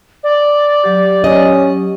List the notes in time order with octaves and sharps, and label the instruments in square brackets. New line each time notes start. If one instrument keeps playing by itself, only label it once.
[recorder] D5
[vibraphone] F#3 G4
[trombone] C#4 [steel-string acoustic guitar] D#5